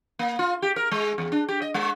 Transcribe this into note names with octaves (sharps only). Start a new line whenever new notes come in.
A#3
F4
G4
A#4
G#3
E2
D4
G4
D#5
G#3